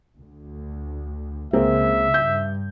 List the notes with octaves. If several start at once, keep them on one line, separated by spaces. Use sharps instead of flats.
D2
C#2 C#3 G#3 A#3 C4 E5
G2 G6